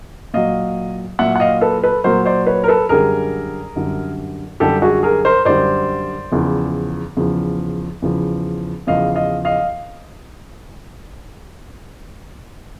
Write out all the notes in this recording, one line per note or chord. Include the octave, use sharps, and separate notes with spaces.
A#2 F#3 D#5 F5
A#2 F#3 E5 F#5
F#5
D#5 F5
A4 B4
A4 B4
A#2 F#3 A#4 C5
C5 D5
B4 C#5
A#4
A4 B4
F#2 D3 G3 G#4 A#4
F#2 D3 G3
F#2 D3 G3 G4 A4
F#4 G#4
G#4 A#4
A#4 C5
F#2 D3 G3 C5 D5
E2 C#3 F3
E2 C#3 F3
E2 C#3 F3
E2 C#3 F3 D#5 F5
D#5 F5
D#5 F5